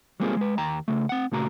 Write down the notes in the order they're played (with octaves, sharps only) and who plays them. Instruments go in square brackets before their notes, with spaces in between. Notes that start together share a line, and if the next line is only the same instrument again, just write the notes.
[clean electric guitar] G3 G#3 A#3 C4 F4 G#4
G#3 B4
D#2 G5 A#5
C#3 A3
C4 F#5
A#2 C#3 A3 F#4 A#5